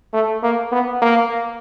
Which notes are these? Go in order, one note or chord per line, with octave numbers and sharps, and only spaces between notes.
A3
A#3
B3
A#3